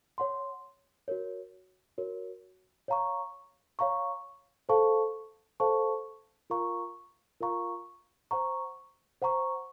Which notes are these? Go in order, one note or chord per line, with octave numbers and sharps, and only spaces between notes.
C#5 F#5 C6
F#4 A#4 C#5
F#4 A#4 C#5
C#5 F5 A#5 C#6
C#5 F5 A#5 C#6
A4 C5 F5 A5 C#6
A4 C5 F5 A5 C#6
F4 A#4 F5 A#5 C#6
F4 A#4 F5 A#5 C#6
C5 F#5 A#5 C#6
C5 F#5 A#5 C#6